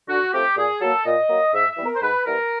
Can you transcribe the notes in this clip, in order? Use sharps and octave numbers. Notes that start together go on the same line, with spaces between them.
D3 F#4
F3 A3 C4 G4
A#2 G#4
F#3 A#3 A4
A#2 D#5
F#3 A#3
G#2 E5
E5
E3 G3 B3
A#4
C5
G#2 B4
E3 G3 B3 A#4